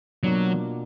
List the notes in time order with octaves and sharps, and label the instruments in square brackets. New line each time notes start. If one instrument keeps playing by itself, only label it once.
[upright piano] B2 A#3 D4 F4 [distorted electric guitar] F#3